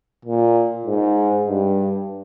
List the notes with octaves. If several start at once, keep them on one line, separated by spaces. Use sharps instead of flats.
A#2
G#2
G2